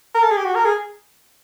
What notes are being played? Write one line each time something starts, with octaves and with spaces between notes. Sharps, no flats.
A#4
A4
G#4
G4
F#4
A#4
G#4